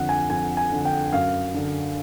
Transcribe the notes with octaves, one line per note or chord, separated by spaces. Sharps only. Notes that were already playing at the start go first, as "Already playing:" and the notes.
Already playing: F2 D3 F#5
G#5
F2 G#5
G#5
D3
G5
F#2 F5
D3